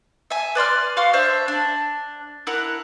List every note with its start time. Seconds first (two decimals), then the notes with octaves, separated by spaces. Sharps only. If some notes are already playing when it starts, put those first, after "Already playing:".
0.30 E5 G#5
0.55 B4 D5 C6 F6
0.97 F#4 F5 C6 F6
1.13 D4 C5 E5
1.48 D4
2.47 E4 A#4 F#5